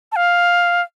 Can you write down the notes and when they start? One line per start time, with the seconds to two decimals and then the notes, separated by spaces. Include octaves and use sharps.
0.12 A5
0.16 F5